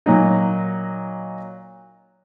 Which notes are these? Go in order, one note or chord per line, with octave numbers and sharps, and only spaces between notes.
A#2 F#3 D#4